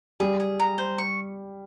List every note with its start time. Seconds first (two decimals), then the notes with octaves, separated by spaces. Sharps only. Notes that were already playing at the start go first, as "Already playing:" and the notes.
0.20 G3 G#4
0.40 G#4
0.60 A#5
0.78 C5
0.98 C#6